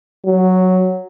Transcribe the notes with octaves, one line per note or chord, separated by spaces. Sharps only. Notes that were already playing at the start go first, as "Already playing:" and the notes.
F#3